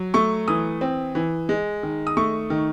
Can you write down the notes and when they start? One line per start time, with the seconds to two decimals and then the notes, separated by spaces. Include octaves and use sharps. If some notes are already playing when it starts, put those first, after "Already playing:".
Already playing: F#3
0.14 A3 C#6
0.48 E3 D#6
0.81 C4
1.15 E3
1.49 G#3
1.83 D#3
2.07 D#6
2.17 A3 C#6
2.50 D#3